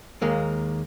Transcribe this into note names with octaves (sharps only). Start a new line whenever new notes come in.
D#2 G#3 A#3